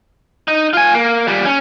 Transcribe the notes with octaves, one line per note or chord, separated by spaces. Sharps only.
D#4
F4 G#5
A#3
A#2 G3
C#4